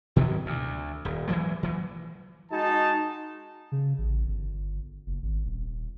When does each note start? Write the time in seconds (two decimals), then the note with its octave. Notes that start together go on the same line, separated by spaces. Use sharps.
0.16 B2 D#3 E3 F#3
0.46 D2
1.05 D#1
1.27 E3 F#3 G#3 A#3
1.63 E3 F#3
2.51 G#3 D#4 F#4 A5
3.72 C#3
3.98 A1
4.26 G1
5.06 F#1
5.22 G#1
5.45 D#1